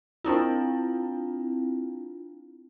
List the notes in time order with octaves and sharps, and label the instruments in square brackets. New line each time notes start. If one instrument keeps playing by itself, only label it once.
[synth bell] C4 D4 E4 F4